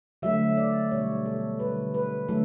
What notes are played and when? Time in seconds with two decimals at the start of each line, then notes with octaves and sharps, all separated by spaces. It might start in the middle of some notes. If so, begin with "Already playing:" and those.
0.22 D3 F#3 A3 E5
0.57 D5
0.91 B2 G3 C#5
1.26 A4
1.59 D3 G3 B4
1.94 B4
2.28 D3 F#3 A3 A4